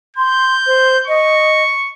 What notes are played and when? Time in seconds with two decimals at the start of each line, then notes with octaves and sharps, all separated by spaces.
0.17 C6 G6
0.66 C5
1.07 D#5 C#6